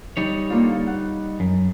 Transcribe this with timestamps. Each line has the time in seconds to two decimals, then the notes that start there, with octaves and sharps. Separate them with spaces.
0.17 G3 D#4 C#5
0.50 D3 A#3 F4
0.87 F#5
1.40 F#2